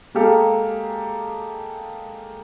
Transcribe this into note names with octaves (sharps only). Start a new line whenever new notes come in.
G#3 A#3 G4 A4 F5